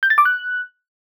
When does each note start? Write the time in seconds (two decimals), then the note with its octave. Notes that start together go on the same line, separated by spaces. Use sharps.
0.03 G6
0.10 A6
0.18 D6
0.25 F#6